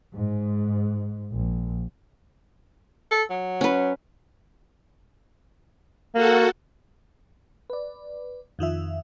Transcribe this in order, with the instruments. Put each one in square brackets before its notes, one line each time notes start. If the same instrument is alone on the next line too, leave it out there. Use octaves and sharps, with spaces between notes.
[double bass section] G#2
A#1
[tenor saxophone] A4
F#3
[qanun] C#4 B4
[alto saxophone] A#3 [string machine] F#4 A4 F#5
[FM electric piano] B4 D5
F2 D#3 F4 E5